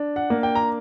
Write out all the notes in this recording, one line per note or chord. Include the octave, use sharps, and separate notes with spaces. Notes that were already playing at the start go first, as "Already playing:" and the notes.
Already playing: D4
F#5
A#3
G5
A#5